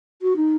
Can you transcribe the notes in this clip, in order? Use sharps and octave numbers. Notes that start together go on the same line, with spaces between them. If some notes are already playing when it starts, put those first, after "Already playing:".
F#4
D#4